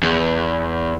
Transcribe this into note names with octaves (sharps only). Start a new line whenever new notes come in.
E2